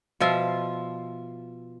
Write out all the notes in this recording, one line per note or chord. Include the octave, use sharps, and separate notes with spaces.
B2 F3 F4 E5